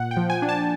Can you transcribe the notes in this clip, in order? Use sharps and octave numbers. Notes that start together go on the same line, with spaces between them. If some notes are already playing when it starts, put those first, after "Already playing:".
Already playing: A#2 F#5
G5
F3
G#5
D4
A5